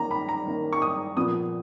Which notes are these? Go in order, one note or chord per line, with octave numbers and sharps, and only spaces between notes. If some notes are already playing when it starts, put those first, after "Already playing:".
Already playing: D#3 A#3 C#4 A#5
B5
A#5
D#3 A#3 C#4
C#6
D#6
A#2 F3 B3 D#6